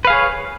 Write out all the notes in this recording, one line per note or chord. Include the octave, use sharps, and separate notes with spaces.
G#4 B4 C#5 F5